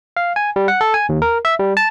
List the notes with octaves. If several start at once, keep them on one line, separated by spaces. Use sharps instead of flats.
F5
G#5
G3
F#5
A4
G#5
D#2
A#4
E5
G3
A5